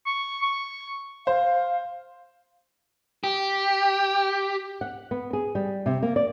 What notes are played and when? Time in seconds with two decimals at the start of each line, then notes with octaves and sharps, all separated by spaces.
0.06 C#6
0.42 C#6
1.27 C5 F5
3.24 G4
4.81 F#5
5.11 B3
5.33 G#4
5.55 G3
5.86 C3
6.02 A#3
6.16 D5